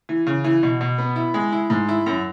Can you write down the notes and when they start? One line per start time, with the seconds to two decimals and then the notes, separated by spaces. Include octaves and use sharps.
0.09 E3
0.27 C#3
0.44 E3
0.63 B2
0.81 B2
0.98 B3
1.16 E4
1.34 G#3
1.52 E4
1.70 G#2
1.89 E4
2.06 F#2